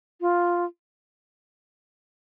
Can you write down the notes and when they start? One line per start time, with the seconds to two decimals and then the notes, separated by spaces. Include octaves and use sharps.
0.21 F4